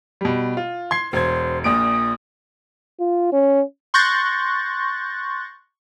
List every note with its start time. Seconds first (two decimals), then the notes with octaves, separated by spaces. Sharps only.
0.21 B2 G3
0.57 F4
0.91 C6 G#6 C7
1.13 E1 C5 G#6
1.64 A#1 A#2 D#6 D7
3.00 F4
3.32 C#4
3.94 C6 C#6 F#6 G6 A6 A#6